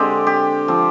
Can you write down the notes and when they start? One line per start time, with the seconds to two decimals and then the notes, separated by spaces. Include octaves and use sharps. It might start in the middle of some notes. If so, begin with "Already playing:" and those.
Already playing: D3 G#3 C4 G4
0.27 G4
0.68 F3 C4